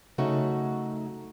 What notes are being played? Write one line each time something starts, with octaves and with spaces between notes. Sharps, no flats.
C#3 F#3 A3 D#4 F#4